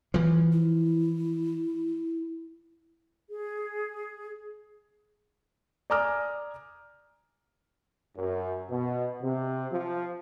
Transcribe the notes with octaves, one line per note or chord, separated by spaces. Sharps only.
E3 F3
E4
G#4
D5 G#5 A#5 D6 D#6 F6
F#2
B2
C3
F3